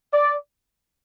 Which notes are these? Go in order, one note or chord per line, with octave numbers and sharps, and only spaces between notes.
D5